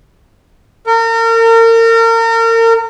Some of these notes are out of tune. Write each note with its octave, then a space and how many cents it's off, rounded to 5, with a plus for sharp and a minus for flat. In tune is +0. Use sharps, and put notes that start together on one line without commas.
A#4 -35